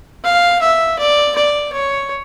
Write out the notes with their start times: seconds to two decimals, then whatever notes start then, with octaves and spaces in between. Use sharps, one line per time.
0.24 F5
0.61 E5
0.99 D5
1.36 D5
1.73 C#5